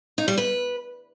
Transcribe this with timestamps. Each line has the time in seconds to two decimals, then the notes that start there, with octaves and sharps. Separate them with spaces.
0.18 D#4
0.28 G3
0.38 B4